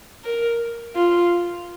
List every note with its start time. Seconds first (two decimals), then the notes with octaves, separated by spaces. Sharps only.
0.25 A#4
0.96 F4